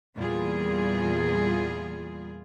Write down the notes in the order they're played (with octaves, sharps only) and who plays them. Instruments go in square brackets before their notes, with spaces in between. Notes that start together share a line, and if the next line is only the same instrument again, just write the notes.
[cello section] E2 A#2 E3 G3 F4 G#4